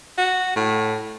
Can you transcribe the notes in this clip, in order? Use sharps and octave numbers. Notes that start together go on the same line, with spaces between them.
F#4
A2